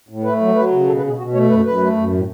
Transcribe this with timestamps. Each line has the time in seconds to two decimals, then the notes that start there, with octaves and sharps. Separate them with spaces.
0.09 A2
0.24 A3 B4
0.40 F#3
0.55 F#3 B4
0.72 C#3
0.87 B2 A4
0.97 B4
1.02 B2 G#4
1.18 B2 F#4
1.34 A3 C#5
1.49 F#2 B4
1.65 F#2 B4
1.80 A3
1.96 F#2
2.12 A2